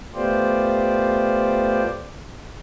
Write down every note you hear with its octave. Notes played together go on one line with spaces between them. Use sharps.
A3 B3 F4 G4 C5 D5